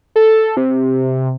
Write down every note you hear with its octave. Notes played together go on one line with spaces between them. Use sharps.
A4
C3